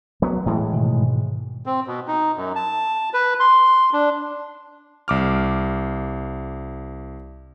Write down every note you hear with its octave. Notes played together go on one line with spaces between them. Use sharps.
F#3 B3
A2 E3 G#3
G#2 B2 D#3
C4
B2
D#4
F#2
A5
B4
C6
D4
C2 D6 F6